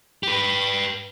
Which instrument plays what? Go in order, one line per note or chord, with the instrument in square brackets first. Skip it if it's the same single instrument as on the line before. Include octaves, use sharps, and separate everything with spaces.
[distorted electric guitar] G4 B4